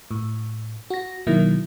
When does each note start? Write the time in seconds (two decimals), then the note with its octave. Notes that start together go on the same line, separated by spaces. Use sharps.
0.11 A2
0.90 F#4 A#6
1.27 B2 D#3 F#3 A#3 E4